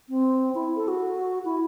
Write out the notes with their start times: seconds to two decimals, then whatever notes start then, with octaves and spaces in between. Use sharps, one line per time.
0.09 C4
0.55 E4
0.76 A4
0.88 F#4
1.45 E4